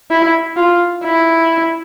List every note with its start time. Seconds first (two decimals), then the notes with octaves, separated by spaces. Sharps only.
0.11 E4
0.57 F4
1.04 E4